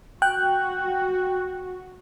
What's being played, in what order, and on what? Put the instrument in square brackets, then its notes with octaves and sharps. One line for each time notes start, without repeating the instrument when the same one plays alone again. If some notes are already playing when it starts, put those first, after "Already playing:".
[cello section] F#4 [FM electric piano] G5 F#6